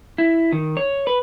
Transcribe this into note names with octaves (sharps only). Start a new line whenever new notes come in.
E4
D#3
C#5
B4